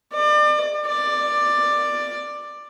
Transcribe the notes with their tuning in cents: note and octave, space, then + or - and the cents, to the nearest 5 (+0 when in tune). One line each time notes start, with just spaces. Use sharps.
D5 +35
D5 +10